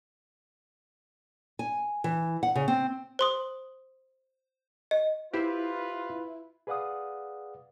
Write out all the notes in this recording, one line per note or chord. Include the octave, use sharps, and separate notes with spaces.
G#5
E3
F#5
C#3
C4
C5 C6 D#6
D#5
E4 F4 G4 B4 C5
G#4 B4 D5 F5 F#5 D#6